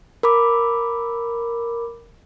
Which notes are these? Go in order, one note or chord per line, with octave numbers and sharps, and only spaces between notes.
A#4 B5 D6